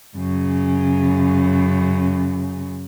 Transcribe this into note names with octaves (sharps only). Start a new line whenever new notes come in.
F#2 C#3